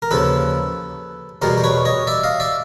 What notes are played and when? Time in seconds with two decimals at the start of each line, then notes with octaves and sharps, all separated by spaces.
0.02 A#4
0.11 D#2 C#3 F3 A4 B4
1.42 E2 B2 G3 A#4 C5
1.58 C5
1.64 B4 C#5
1.85 C#5 D#5
2.07 D5 E5
2.23 D#5 F5
2.40 D5 E5